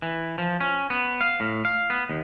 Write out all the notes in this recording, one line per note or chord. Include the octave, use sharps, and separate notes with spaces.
E3
F3
C#4
B3
F5
A2
F5
B3
D#2